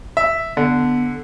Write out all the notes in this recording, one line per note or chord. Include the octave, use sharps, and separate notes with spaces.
E5
D3 B3